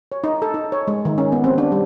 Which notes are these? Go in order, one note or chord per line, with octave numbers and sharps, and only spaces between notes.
C#5
D#4
A4
D#4
C#5
G#3
D#3
C#4
B3
C4
D4
G3